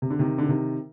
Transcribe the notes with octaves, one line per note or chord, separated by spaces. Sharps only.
C3
D3
C3 D#3
D3
C3 D#3